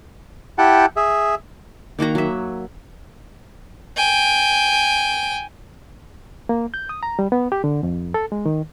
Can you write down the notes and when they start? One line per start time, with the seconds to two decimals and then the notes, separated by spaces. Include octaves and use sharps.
0.58 E4 G4 F#5 G5 A5
0.97 G#4 E5
1.99 D#3 A#3 F#4 A#5
2.15 F#3 E5
3.96 G5 G#5
6.49 A#3
6.74 G6
6.89 D#6
7.03 A#5
7.19 G3
7.32 B3
7.52 G4
7.64 D3
7.83 F2
8.14 A4
8.32 G#3
8.46 D#3